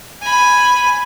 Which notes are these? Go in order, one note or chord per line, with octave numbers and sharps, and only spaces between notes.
G#5 B5